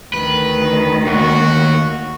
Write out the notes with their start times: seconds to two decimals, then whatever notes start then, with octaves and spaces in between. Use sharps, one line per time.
0.14 D2 D#3 B4
1.07 D#2 F#4